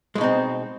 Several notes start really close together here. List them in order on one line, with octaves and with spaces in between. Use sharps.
G#3 B2 D#4 C4